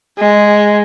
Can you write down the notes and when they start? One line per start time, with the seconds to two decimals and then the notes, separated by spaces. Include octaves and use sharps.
0.19 G#3